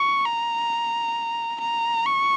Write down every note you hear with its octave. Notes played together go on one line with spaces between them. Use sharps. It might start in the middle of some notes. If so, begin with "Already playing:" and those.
Already playing: C#6
A#5
A#5
C#6